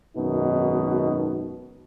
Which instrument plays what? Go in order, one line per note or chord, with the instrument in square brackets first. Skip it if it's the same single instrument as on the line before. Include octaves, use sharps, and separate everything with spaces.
[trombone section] G#1 F#2 B2 D#3 D#4